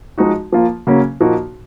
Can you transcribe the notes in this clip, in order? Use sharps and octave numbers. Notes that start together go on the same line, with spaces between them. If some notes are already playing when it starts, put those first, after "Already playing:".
F3 G#3 D#4 F#4
F3 A#3 F4
C#3 F#3 A#3 C#4
A#2 F3 A#3 D#4 F#4